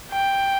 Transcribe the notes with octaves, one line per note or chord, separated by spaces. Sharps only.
G5